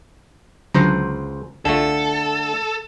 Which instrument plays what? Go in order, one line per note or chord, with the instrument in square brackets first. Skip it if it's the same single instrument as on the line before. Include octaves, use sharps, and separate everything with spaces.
[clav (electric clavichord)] C#2 C5 A#5 [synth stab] D3 F#3
[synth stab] C2 F4 E7 [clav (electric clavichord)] D3 A3 [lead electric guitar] A4